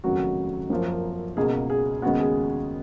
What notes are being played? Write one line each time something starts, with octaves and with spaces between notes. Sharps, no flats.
F1 D#2 C#3 F#3 F#4
F#2 F3 A#3
C#2 B2 A#3 G#4
G#4
D#2 C#3 G#3 B3 F#4
G#4